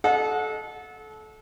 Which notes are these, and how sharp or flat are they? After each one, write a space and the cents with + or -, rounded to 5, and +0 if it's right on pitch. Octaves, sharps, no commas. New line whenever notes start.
A4 -25 D#5 -10 F#5 -25